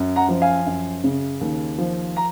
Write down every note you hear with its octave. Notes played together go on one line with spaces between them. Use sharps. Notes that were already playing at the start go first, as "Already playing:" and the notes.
Already playing: F#2
F#5 A#5
F3
F5 G#5
F#2
C#3
D#2
F3
A#5